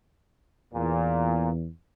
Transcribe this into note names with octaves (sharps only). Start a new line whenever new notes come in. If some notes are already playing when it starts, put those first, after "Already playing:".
E2 A#2